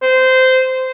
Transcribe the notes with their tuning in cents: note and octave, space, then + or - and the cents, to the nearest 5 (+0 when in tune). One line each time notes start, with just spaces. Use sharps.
C5 -15